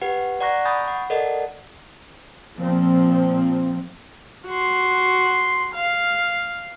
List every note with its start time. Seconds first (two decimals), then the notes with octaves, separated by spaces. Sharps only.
0.01 G4 B4 F#5
0.40 D5 F#5 A#5 C#6 F#6 A#6
0.65 G#5 B5 C#6 D#6 G6 A6
0.88 F#5
1.10 A4 A#4 D5 D#5 F#5
2.58 A#2 F3 C4
4.47 F#4 C6
5.74 F5